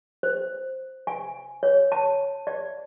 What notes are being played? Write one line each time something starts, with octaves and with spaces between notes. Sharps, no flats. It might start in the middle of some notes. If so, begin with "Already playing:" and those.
C5
G#5
C#5
A5
D5